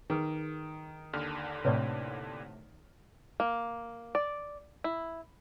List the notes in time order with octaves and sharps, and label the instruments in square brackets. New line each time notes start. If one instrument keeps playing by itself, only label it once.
[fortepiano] D#3 [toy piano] G#4 B4
[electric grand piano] D#2 D3 F6
[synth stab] A2 C3 [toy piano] B4 C#5 D5
[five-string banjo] A#3
D5
E4